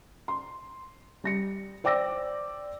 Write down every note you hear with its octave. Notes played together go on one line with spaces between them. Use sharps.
C6
G3 A#6 C#7
C5 D5 G5 D6 E6 A#6